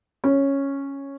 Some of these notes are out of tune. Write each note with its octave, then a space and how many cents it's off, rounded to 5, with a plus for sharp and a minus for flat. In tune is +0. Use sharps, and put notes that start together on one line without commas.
C#4 -5